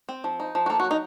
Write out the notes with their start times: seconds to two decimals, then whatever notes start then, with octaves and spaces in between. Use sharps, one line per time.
0.09 C4
0.24 F3
0.40 D#4
0.55 F3
0.66 F#4
0.69 A#3 A4
0.80 F#4
0.85 F#3
0.91 D#4